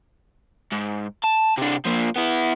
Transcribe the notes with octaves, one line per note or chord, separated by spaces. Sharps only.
G#2
A5
C3 D4
F3 A#3
B3 E4